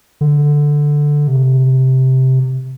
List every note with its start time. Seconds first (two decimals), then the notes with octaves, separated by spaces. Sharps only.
0.21 D3
1.28 C3